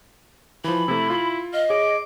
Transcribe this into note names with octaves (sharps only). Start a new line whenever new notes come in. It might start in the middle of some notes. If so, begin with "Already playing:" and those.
E3 F3 B5
C3 A3 E4
E4 F4
D#5 F5
G#4 C#5 D6